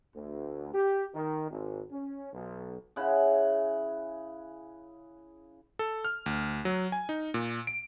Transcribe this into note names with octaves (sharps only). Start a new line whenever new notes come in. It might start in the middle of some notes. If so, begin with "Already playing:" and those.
D2
G4
D#3
G#1
C#4
B1
C#3 E4 F#5
A4
F6
D2
F#3
G#5
D#4
A#2
D7